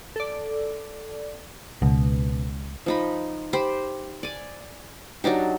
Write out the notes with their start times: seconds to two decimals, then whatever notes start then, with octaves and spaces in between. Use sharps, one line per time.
0.16 A4 D5
1.82 C#2 B2
2.86 F3 D#4 B5
3.53 G4 C5 B5
4.23 D5 G#5
5.24 F#3 D4 D#4 G4